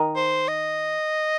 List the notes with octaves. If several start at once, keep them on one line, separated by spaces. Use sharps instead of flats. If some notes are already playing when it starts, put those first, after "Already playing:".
Already playing: D#3 D#4
C5
D#5